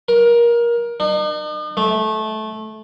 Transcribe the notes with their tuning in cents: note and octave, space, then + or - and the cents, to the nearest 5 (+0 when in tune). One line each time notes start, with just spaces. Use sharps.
A#4 +20
D#4 -45
A3 -20